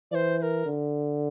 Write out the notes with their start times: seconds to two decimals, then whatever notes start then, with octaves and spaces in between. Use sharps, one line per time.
0.11 E3 C5 D5
0.39 C5
0.42 A#4
0.66 D3